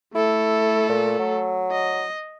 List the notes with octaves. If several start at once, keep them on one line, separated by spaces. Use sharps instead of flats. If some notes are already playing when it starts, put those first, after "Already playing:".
A3 E4 A4
A#2
F#3
D#5